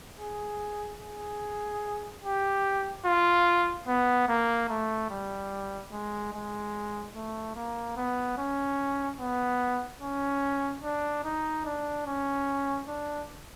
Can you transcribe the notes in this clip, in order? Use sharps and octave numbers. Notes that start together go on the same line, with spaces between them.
G#4
G#4
G4
F4
B3
A#3
A3
G3
G#3
G#3
A3
A#3
B3
C#4
B3
C#4
D4
D#4
D4
C#4
D4